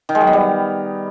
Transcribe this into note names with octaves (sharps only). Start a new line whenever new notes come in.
D#3
G#3
F#3
B3
G3